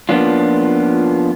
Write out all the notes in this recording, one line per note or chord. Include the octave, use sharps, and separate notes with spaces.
F3 A#3 B3 C#4 D4 F4